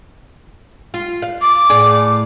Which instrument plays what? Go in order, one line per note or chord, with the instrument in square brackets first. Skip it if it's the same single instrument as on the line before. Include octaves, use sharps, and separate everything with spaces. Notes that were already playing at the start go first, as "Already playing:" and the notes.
[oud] F4
F5
[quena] D6
[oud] A2 G#4 D5